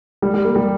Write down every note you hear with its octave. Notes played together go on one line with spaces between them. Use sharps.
G3
G3
A#3
G3